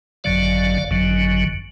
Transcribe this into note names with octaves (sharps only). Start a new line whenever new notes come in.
G#1 F#2 D3 F#3 D5 F5
G#1 F#2 D3 F#3